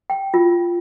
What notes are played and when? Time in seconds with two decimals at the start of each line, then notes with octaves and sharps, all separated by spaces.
0.10 G5
0.34 F4